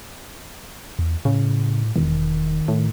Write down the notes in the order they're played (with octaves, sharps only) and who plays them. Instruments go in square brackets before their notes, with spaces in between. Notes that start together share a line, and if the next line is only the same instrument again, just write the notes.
[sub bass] E2
[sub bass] A2 [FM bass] C#3
[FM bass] E1 [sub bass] D#3
[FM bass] A2